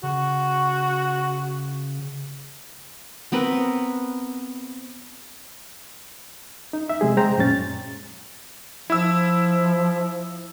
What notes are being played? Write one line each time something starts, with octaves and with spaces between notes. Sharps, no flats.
C#3 F#4
B3 C4 A#4 B4
D#4
E5
C3 G#3 G#4
G#3 C5 G5 A#5
F#2 A#2 C#4 A6
F3 E4 E6